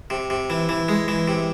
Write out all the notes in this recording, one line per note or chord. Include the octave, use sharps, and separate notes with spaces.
C3
C3
E3
E3
G#3
E3
C3